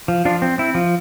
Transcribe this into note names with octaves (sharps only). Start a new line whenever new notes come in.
F3
F3 D4 F4
C4
C4 E4
F3